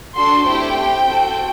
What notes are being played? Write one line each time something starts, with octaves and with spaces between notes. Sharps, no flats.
D4 F#4 A4 C6
A3 C4 E4 G4 G5
C4 G4
C4 F#4 A4